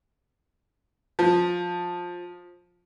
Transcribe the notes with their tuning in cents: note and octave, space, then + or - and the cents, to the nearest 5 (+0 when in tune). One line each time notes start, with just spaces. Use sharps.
F3 +15